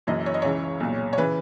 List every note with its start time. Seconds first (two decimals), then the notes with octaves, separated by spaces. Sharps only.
0.07 F#1 F#2 E3 D#5
0.26 C#5
0.34 D#5
0.42 C#2 C#3 E3 C#5
0.80 B1 A#2
1.13 C#5
1.18 C#3 E3 B4